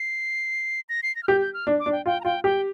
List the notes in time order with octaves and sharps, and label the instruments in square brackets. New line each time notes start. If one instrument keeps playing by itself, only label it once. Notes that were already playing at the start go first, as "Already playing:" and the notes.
Already playing: [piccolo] C7
A#6
C7
A#6
F6
[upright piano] G4 [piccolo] G6
[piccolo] G6
F6
[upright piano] D4
[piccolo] D6
[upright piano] D4
[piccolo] G5
[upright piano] F4 [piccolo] G5
[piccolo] A#5
[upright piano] F4 [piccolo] G5
[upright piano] G4 [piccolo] G5